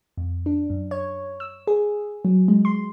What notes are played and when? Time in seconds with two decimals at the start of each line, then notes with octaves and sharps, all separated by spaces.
0.17 F2
0.46 D4
0.70 F#2
0.91 C#5
1.40 E6
1.67 G#4
2.25 F#3
2.48 G#3
2.65 C6